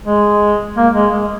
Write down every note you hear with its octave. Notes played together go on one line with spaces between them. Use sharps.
G#3
A#3
G#3
G#3